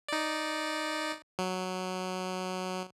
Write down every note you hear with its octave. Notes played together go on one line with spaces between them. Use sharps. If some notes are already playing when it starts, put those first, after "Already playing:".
D#4 D5
F#3